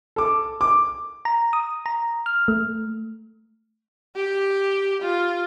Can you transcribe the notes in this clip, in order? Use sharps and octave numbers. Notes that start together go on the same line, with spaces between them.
A4 D6
D6
A#5
D#6
A#5
F6
A3
G4
F4